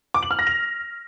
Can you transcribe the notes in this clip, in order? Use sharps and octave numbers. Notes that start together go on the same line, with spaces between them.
D6
F#7
F6
A#6
F7